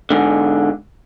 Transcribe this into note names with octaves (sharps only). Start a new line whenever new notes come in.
G#2 D3